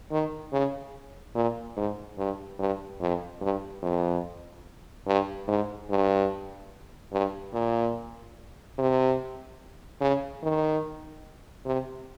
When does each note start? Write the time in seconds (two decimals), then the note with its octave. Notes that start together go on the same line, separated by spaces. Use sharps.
0.12 D#3
0.53 C#3
1.35 A#2
1.77 G#2
2.18 G2
2.59 G2
3.01 F2
3.41 G2
3.83 F2
5.07 G2
5.48 G#2
5.90 G2
7.12 G2
7.54 A#2
8.78 C3
10.01 C#3
10.43 D#3
11.66 C3